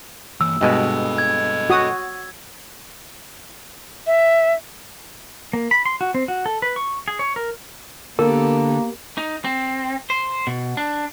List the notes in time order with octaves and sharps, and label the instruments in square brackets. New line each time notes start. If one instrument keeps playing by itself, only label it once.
[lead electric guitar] E3 A#3 [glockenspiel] E6
[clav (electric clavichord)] G2 B2 G#3 [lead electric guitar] A4 D#5
[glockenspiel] G#6
[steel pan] F#4 D#6
[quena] E5
[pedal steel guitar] A#3
B5
C6
F#4
C4
F#4
A4
B4
C#6
G#4
C#5
A#4
[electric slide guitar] D3 A4 [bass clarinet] A#3 [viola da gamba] B3 G4 [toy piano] A#4
[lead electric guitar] D#4
C4
C5
B2
D4